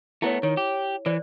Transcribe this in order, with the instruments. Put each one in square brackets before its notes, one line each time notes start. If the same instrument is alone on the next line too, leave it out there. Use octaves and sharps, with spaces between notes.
[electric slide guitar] A3 B3 [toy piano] E4 C#5
[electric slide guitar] D#3 [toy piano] C#5
[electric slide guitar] G4
[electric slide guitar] E3 [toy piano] C5 D5